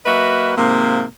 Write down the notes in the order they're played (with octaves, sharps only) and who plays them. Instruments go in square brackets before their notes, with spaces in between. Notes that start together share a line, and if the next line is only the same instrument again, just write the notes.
[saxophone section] F#3 A#3 F#4 B4 D#5 E5
G#2 C3 F3 A#3